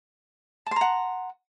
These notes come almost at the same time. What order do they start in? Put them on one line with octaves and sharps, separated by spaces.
A5 C6 A#5 F#5